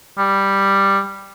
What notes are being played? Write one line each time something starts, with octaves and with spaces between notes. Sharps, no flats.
G3